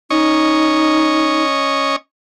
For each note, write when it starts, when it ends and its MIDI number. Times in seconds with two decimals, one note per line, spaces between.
0.10 1.96 61
0.10 1.44 63
0.10 1.96 75
0.10 1.96 85